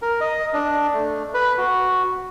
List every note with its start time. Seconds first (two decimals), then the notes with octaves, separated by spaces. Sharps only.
0.02 A#4
0.21 D#5
0.54 D4
0.94 A3
1.34 B4
1.58 F#4